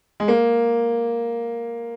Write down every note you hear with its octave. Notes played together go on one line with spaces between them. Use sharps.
G#3
A#3